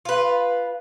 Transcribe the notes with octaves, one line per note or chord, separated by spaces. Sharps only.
F4 B4